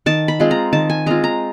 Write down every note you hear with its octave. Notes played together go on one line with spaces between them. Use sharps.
D#3 A5
B5
G#3 C4 F4
A#5
D#3 A5
G#5
G#3 C4 F4 A#5
A#5